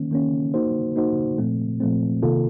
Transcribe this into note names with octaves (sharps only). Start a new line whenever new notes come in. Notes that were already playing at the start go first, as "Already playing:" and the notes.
Already playing: D#3 A#3 C#4
D#3 A#3 C#4
A#3 D#4 F#4 C5
A#3 D#4 F#4 C5
A#2 F3 A3 C4
A#2 F3 A3 C4
C3 D#3 A#3 F4 A4